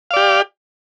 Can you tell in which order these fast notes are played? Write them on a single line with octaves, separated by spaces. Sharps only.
F5 D5 G4